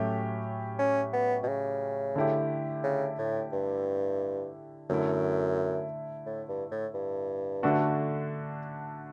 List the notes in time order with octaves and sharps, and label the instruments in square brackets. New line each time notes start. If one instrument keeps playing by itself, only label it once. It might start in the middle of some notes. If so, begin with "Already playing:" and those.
Already playing: [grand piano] A2 F#3 C#4 G4 [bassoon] A3
[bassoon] C#4
B3
B2
C#3
[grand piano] D3 A3 E4 G4
[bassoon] C#3
A2
G2
[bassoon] F#2 [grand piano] D3 A3 E4
[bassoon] A2
G2
A2
G2
[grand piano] D3 A3 D4 F#4